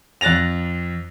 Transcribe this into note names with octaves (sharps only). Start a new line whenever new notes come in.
F2 F#6 A6 A#6 F7